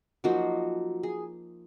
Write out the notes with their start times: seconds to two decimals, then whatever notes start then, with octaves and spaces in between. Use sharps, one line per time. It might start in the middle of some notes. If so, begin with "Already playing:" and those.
0.24 F3 F#3 A#3 D#4 F#4
1.03 G#4